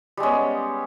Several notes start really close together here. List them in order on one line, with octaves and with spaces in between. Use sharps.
G3 G#3 C#4 B3